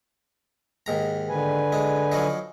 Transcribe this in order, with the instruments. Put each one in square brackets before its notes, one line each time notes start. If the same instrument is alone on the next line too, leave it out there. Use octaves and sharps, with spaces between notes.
[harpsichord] D#2 G#2 A#5
[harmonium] D3 B4 G#5
[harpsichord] G#3
F3 F#3 D#4